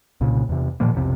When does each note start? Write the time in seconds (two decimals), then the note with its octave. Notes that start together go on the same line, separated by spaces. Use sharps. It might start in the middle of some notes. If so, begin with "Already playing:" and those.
0.21 C2 A#2 C#3
0.49 E2 C3
0.80 A#2 D#3 F3 A#3
0.94 B1 F2 C3